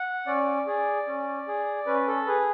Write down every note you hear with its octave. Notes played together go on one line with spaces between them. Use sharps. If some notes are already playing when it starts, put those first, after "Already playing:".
Already playing: F#5
C#4 D5
G#4
C#4
G#4
C#4 B4
A4
G#4 B4